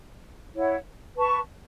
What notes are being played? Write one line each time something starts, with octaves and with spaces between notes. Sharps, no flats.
E4 C#5 F#5
B4 A5 C#6